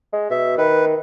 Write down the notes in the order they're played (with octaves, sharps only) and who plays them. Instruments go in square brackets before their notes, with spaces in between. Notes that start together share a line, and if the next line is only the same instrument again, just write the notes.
[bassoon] G#3
[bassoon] B2 [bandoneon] E5
[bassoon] D#3 [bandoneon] B4